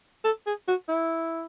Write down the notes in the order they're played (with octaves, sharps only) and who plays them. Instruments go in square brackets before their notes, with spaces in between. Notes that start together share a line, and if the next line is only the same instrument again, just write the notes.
[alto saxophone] A4
G#4
F#4
E4